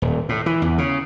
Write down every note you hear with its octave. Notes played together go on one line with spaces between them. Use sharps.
D#1
A2
E3
E2
C#3